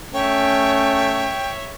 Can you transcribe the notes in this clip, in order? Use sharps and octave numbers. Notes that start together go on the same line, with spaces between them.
A3 C#4 C#5 E5 G5